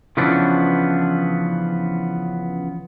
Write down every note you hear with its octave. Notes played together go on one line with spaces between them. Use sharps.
C#3 E3 F3 B3 C#4 D4